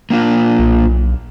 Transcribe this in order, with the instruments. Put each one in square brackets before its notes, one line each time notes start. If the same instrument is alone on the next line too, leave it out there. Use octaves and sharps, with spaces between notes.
[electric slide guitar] A#3 D4 F4
[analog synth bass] B1